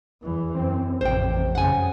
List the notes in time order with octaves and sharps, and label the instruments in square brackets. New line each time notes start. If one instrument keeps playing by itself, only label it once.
[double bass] E2 E3
[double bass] F#2 [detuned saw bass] C4
[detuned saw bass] A1 [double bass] F2 C3 [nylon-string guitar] C5 G5
[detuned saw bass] F#2 [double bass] C#3 [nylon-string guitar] F#5 G#5